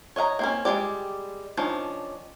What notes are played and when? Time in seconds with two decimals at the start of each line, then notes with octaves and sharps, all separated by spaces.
0.16 C#5 D#5 F5 A#5
0.39 A#3 C4 C#4
0.65 G3 G#3 G4 D5
1.57 D#3 F3 C#4 D4